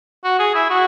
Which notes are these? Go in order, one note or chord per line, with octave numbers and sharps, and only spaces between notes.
F#4
G#4
E4
F#4